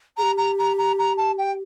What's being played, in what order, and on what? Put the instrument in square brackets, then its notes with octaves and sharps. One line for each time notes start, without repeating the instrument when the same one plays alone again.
[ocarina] G#4 [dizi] A#5
[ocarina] G4
[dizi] A#5
A#5
A#5
A#5
A5
G5